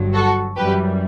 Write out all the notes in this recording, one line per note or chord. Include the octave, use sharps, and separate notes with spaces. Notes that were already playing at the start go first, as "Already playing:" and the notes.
Already playing: G1 G2 F#3
F#4 A4
F#2 E3 G3 G4 B4